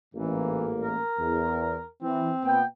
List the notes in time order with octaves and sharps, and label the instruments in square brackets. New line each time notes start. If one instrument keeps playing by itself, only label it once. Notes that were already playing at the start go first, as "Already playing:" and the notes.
[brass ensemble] A1 G#2 A#3 [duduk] E3
[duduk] A#4
[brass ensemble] E2
[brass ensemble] E3 [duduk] C4
[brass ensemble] A#2 B3 G5